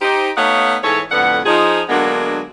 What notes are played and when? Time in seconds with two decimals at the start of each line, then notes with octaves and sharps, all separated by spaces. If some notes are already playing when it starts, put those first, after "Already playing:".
0.01 D#4 G4 C5
0.37 A3 B3 D#4 C#5 F5 F#5
0.83 G#2 E3 A4 C#5
1.11 F2 A2 D3 B3 F#5
1.46 F3 D#4 G#4
1.89 D3 F#3 G#3 A#3 B3 D4